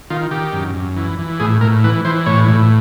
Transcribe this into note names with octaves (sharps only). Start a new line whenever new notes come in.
D#3 F4
D#3 G4
F#2
F#2
E3
E3
A2 G#4
A2 A#4
E3 B4
E3 C5
A2 C#5
A2